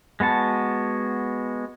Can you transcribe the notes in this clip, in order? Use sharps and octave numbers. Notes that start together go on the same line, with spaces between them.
G#3 B3 F#4 A5